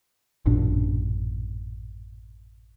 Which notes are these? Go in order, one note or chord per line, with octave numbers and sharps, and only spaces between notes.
A1 F#2 A#2 D4